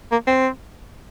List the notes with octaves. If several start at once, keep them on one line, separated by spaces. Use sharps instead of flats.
A#3
C4